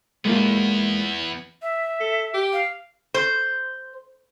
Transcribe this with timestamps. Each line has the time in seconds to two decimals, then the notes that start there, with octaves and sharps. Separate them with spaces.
0.25 E2 G#3 A#3 B3 F4
1.62 E5
2.00 A4
2.34 G4
2.53 F5
3.14 C5